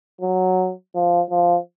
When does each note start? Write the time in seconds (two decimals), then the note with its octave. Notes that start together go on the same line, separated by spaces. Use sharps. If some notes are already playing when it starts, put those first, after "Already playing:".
0.21 F#3
0.95 F3
1.31 F3